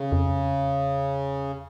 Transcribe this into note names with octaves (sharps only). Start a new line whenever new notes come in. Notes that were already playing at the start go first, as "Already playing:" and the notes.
Already playing: C#3
F2
E2